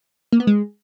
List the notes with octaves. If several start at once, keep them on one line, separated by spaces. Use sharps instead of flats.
A#3
B3
G#3